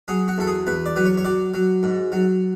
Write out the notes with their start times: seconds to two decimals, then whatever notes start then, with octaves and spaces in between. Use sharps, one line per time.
0.08 F#3 G#4
0.28 F#4
0.38 E2 A4
0.47 G#4
0.67 E2 B4
0.86 D5
0.96 F#3 B4
1.05 C#5
1.17 C#5
1.25 F#3 D5
1.54 F#3
1.83 G#2
2.12 F#3